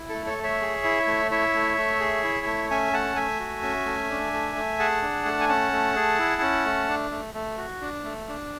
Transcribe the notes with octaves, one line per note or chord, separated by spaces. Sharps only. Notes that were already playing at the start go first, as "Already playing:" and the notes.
Already playing: E4
A4
A3
A4 C#5
A3
C#5 E5
G#4
E4
A3
E4 C#5 E5
A3
A3
G#4
E4
A3
C#4 E5 G#5
A3 F#5 A5
A3 E5 G#5
F#4
C#4
A3
D4
A3
A3
G#4 F#5 A5
D4
A3
G#5
C#4 F#5 A5
A3
G#4
E4
C#4
A3
D4
A3
A3
F#4
D4
A3
D4